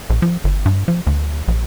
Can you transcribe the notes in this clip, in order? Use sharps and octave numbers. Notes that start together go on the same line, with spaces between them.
A#1
F3
G1
G2
F3
D2
A#1